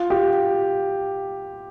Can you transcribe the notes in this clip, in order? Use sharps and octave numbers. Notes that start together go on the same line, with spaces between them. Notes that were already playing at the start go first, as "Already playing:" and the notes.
Already playing: F4
G4